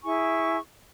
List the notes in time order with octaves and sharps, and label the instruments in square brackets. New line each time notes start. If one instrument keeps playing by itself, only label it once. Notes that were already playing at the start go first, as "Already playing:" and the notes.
[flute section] E4 G#4 G#5 C#6